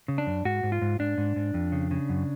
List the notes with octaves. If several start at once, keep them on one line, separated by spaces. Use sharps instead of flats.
C#3
D4
F#2
G#2 F#4
G#2
F4
G#2
G#2 D4
G#2
G#2
F2
C#3
C#3
F#2